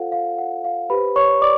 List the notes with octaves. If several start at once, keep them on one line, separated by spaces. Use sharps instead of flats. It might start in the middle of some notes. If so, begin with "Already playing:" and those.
Already playing: F4 A4 C5 F5 F#5
F5
F#5
F5
G4 B4 C5 B5
C#5 C#6
D5 D6